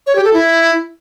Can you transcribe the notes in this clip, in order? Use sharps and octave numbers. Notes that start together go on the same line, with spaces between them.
C#5
G4
A4
E4